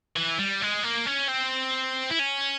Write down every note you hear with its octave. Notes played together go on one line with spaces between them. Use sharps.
E3
G3
G#3
A#3
C#4
C4
E4
C#4